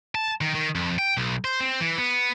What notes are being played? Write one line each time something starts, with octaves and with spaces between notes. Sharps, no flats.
A5
D#3
D#3
F2
G5
B1
C5
C4
E3
B3